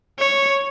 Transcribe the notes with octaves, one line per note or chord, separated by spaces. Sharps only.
C#5